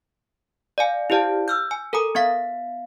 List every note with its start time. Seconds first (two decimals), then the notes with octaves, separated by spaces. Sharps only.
0.78 D5 F5 G#5
1.10 E4 G4 C5 D5 F5 A5
1.48 E6 F6 G6
1.71 G#5
1.93 A4 A#4 G#5 A#5 D#6
2.15 B3 E5 F5 B6